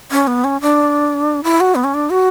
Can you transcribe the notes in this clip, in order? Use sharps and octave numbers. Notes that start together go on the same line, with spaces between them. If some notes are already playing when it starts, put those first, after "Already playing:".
C#4
B3
C#4
D4
E4
F#4
B3
C#4
D4
F#4